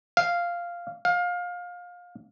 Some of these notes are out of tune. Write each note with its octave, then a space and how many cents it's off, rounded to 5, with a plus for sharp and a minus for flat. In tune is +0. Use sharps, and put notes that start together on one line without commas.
F5 -5
F5 +25